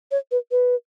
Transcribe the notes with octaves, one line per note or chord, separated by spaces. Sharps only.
C#5
B4
B4